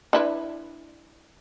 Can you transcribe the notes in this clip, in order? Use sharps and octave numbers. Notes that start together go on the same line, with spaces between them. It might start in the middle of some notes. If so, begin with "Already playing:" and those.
D4 E4 B4